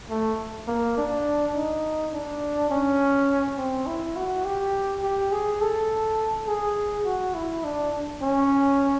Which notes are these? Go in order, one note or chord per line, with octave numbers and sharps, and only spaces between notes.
A3
A#3
D4
D#4
D4
C#4
C4
E4
F#4
G4
G4
G#4
A4
G#4
F#4
E4
D4
C#4